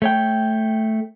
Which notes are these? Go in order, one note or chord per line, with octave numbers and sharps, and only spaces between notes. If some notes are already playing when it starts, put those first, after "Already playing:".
A3 C#5 G5